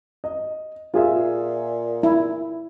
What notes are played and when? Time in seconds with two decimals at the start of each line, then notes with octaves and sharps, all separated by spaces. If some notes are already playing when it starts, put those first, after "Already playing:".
0.24 D#5
0.94 A#2 F4 G#4 E5
2.03 E4